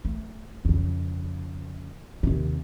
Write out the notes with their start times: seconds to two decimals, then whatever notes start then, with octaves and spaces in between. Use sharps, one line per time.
0.05 A3
0.65 F2 C#3
2.23 D#2 C3